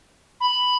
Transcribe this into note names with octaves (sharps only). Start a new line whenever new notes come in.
B5